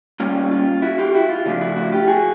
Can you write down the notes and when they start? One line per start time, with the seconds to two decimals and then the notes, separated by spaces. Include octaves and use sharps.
0.20 B2 G3 A#3 C#4 F4
0.51 F4
0.82 E4 F#4
0.98 F4 G4
1.15 E4 F#4
1.29 F4
1.46 C#3 F3 A3 D4 F4
1.61 E4 F#4
1.76 E4 F#4
1.92 F4 G4
2.08 F#4 G#4